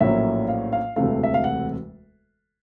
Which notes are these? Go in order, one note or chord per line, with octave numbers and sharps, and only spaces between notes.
A#1 A2 F#3 A#3 C#4 E5
F5
F5
E1 D2 C3 E3 A3 F5
E5
F5
F#5